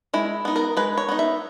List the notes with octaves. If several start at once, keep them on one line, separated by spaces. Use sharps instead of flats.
G#3 E4
B3 D#4
A#4
G#3 B4
C#5
B3 D#4
E5